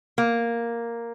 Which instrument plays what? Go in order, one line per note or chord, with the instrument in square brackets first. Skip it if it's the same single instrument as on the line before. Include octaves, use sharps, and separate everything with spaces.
[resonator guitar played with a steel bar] A#3